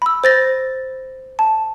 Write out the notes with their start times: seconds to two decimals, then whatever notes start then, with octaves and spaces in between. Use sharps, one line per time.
0.02 B5 E6
0.24 C5 A6 A#6
1.39 A5